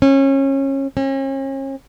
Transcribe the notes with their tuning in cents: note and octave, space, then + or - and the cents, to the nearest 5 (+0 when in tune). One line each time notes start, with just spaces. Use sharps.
C#4 -25
C#4 -40